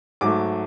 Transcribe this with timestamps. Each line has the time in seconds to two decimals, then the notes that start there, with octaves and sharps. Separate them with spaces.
0.21 G#2 F#3 A3 D6